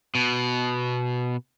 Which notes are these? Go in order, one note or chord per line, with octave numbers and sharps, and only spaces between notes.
B2